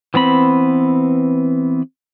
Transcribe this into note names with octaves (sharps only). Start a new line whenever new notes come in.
E3 B3 C4 B5